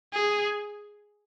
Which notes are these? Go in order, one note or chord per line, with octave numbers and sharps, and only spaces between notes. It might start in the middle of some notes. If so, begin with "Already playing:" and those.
G#4